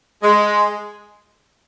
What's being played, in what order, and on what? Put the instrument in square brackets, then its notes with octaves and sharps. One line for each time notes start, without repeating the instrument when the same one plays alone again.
[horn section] G#3